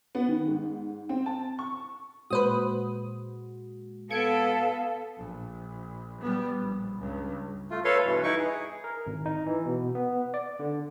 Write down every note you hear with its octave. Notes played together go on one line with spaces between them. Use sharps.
B3
D#3
G#2
C4
A5
C#6
A#2 G#3 F#4 B4 C5 D#6
B3 A4 F5 G#6 C#7 D7
A#1
G3 B3
A#1
C#2 G2
A3 F4
A4 B4 C#5 F5 C6
G2 B2 E3
D#4 E4 B4 C#6
G#4
A#4
G#1
D#4
E3
B2
B3
D5
D3